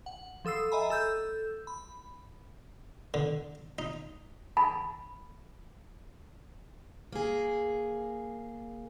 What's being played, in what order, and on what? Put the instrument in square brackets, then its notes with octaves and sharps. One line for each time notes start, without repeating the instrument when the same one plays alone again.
[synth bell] F#5
F3 A4 D#6 E6 C7
D#5 E5 G#5 A#5 B5
A4 E6 G6
B5
[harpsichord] D3
D#4
[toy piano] B5
[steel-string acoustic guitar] A#3 G#4